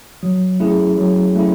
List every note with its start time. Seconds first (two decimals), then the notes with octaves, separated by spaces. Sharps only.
0.23 F#3
0.60 A3 C#4 E4 G#4
0.98 F#3
1.36 A3 C#4 E4